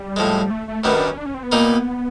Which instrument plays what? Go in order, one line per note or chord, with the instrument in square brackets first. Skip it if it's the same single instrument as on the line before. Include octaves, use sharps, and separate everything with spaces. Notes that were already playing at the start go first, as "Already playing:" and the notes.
Already playing: [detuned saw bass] G3
[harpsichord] A2 F3 G#3
[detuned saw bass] A3
A3
[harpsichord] F#2 D#3 G3 B3 [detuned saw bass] A3
[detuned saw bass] D4
C#4
D4
C#4
C4
B3
[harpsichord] A#2 G3 A#3 D#4